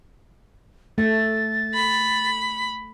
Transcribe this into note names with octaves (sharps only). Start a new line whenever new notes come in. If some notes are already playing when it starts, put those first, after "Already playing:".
A3 A6
B5